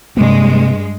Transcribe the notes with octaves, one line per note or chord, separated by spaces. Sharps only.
G2 C3 G#3 A#3